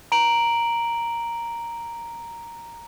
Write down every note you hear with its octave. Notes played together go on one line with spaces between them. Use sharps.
A#5 D7 F#7